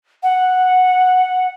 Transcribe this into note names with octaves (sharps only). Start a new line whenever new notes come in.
F#5